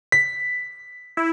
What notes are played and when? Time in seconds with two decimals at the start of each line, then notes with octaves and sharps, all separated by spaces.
0.12 B6
1.17 E4